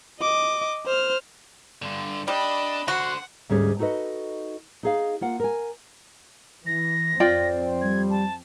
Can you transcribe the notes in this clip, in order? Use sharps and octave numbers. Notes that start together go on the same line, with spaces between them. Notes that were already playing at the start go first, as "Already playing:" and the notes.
D#5 D6
C5 F6
G2 D3
G3 D4 D#5 B5
D3 F#4 C5 F#5
D2 G#2 G3 A3 C#4 G#4
D#4 F#4 A4 B4 D#5
D#4 G#4 F5
A#3 F4 F#5
A#4 G#5
E3 A#6
F2 C4 F4 D5 G5
G3 G#6
A5